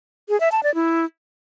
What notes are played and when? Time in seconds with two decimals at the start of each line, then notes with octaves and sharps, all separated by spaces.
0.29 G#4
0.40 E5
0.52 A5
0.63 D5
0.75 E4